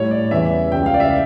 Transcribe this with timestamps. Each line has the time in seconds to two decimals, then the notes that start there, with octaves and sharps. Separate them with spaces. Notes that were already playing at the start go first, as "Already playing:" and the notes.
Already playing: A2 G3 C#5
0.11 D5
0.31 E2 C#3 E3 G3 E5
0.72 C#2 C#3 E3 G3 G5
0.86 F5
0.94 D5
1.00 E5